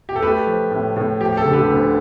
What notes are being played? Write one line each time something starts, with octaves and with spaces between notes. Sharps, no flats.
G4
A4
A3 G4 B4
F3
A2
A2
F3 G4
G4
A4
D3
G4 B4
D2